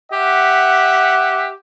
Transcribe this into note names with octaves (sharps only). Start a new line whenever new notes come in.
G4 E5 F#5